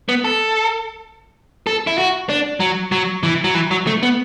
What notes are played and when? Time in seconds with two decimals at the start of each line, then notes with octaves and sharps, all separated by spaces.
0.09 B3
0.24 A4
1.67 A4
1.87 E4
1.98 F#4
2.29 D4
2.60 F#3
2.92 F#3
3.23 E3
3.44 F#3
3.55 E3
3.71 F#3
3.87 A3
4.03 B3